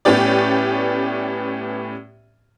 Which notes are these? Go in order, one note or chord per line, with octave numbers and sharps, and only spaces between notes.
A2 B3 C#4 G4 D5